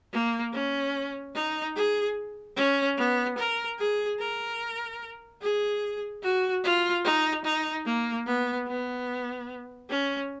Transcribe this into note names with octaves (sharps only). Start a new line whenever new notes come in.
A#3
C#4
D#4
G#4
C#4
B3
A#4
G#4
A#4
G#4
F#4
F4
D#4
D#4
A#3
B3
B3
C#4